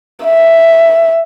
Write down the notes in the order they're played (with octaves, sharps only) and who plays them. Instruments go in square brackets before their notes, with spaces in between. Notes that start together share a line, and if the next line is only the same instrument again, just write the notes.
[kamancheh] E5